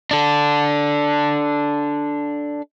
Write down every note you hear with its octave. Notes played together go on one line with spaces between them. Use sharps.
D4 A4